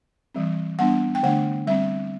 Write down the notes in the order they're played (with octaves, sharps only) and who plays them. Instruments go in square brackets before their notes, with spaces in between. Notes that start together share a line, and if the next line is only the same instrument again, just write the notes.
[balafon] E3 G3 C4
G3 B3 D4 F#5
G5
D3 A3 D4 F#5
G3 C4 E5